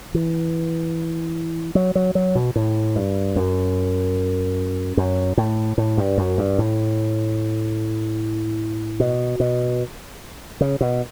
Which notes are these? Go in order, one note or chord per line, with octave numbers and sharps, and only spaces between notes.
E3
F#3
F#3
F#3
B2
A2
G2
F#2
F#2
A2
A2
G2
F#2
G2
A2
B2
B2
C#3
B2